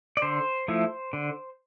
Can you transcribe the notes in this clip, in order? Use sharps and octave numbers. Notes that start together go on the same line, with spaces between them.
D5
D3 C5
F3 A3 E4
D3